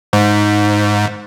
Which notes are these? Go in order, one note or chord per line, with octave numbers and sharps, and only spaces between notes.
G#2